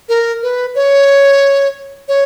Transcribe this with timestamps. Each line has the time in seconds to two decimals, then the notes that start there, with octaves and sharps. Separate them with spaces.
0.09 A#4
0.43 B4
0.75 C#5
2.08 C#5